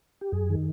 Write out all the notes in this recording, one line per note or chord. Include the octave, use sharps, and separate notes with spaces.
G4
F#2 G#4
D#3